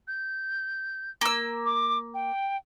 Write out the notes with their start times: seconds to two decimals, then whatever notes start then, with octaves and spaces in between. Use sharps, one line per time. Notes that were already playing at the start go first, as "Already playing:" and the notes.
0.08 G6
1.21 A#3 E6
1.66 D6
2.14 G5